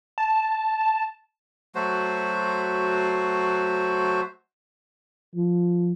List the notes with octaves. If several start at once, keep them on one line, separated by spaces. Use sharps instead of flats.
A5
F#3 A3 F#4 C5
F3